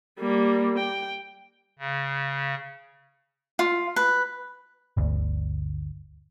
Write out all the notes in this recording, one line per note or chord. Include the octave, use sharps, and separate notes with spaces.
G3 A#3
G5
C#3
F4
B4
G1 D2